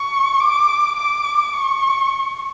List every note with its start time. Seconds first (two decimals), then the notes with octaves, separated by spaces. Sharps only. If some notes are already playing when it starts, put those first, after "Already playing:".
Already playing: C#6
0.40 D6
0.97 D6
1.54 C#6